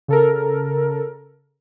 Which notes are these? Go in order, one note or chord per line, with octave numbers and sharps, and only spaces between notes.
C#3 A4 A#4